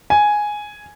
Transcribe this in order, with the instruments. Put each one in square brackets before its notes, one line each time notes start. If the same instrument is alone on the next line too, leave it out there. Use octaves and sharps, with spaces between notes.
[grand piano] G#5